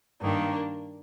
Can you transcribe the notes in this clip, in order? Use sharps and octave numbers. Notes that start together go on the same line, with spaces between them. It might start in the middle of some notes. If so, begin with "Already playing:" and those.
G2 D#3 A#3 D4